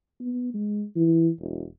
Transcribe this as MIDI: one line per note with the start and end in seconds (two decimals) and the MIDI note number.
0.20 0.50 59
0.54 0.84 56
0.96 1.29 52
1.40 1.64 28